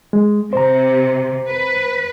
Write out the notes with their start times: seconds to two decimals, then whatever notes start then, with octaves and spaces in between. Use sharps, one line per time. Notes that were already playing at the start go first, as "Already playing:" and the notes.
0.13 G#3
0.53 C3 C5 A#5
1.48 B4